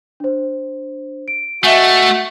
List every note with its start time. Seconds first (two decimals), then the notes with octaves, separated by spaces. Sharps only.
0.20 D4 C5
1.28 D7
1.64 A3 F#4 D#5 E5 G#5